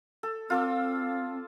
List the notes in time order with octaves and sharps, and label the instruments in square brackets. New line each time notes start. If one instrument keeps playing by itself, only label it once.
[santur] A4
[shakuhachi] C4 [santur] F4 A4 D5